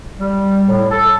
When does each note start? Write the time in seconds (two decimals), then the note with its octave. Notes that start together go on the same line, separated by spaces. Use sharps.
0.19 G3
0.66 A2
0.90 A4